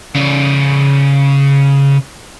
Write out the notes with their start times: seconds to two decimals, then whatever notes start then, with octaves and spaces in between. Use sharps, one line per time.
0.15 C#3 D5